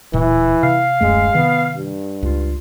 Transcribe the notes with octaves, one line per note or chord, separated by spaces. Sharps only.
D1 A#2 E3
C3 F5
D1 F#2 G#3 A3
C3 D#3 B3
G2
C#2 F4